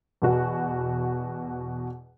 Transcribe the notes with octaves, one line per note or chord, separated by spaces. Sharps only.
E2 B2 F#4